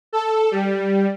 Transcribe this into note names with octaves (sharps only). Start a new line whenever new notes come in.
A4
G3